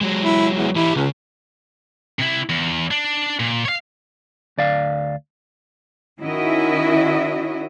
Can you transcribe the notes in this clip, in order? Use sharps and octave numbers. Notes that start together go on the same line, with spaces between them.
F#3 G#3
E4
E2
E3 E4 G4
C#2 C#3
C3 E4
E2
D4
A#2
C#5 F5
D2 D5 F5
D#3 C#4 E4 F#4 D#5 E5